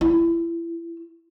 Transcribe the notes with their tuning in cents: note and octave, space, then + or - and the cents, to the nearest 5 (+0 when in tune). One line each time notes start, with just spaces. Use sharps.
E4 +25